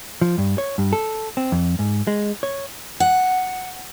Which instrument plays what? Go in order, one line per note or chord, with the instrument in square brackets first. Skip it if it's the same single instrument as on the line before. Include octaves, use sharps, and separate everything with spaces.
[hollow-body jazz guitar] F3
G2
C#5
G2
A4
C4
F2
G#2
G#3
C#5
[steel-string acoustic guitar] F#5